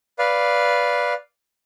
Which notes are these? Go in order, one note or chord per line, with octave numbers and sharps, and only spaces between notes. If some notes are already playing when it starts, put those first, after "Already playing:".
B4 D5 F5